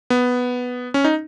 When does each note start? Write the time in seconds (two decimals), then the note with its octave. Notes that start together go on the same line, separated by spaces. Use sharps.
0.10 B3
0.94 C#4
1.04 D#4